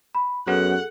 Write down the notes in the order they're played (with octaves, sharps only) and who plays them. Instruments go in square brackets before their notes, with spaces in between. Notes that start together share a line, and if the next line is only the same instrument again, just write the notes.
[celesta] B5
[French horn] F#2 [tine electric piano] F#3 B3 [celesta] G#4 A4 [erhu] F#5